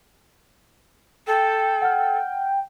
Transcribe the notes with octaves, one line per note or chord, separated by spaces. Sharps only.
A4 G5
F#5 F6